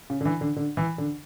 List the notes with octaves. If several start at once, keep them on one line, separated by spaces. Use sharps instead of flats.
C#3
D3
E3
D3
D3
E3
D3